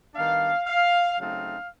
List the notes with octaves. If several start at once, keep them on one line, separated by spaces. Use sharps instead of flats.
D#3 G3 B3 D4 F5
F5
C#3 F#3 A3 C4 D#4 F5